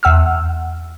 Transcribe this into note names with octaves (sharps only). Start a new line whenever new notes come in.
E2 F#5 E6 F6